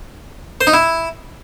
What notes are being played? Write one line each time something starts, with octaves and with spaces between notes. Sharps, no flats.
C5
D#4
E4